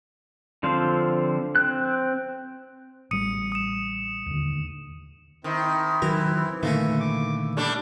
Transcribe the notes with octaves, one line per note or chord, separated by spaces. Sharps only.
D3 F3 C4 C5 F5
C4 F#6
A1 G3 D#6 C#7 D#7
D#6 E7
D#2 D3
D#3 C4 E4
D#3 E3 F#3 A#4
A#2 D3 D#3 A3 A#3 C#4
D6
G3 A3 D4 D5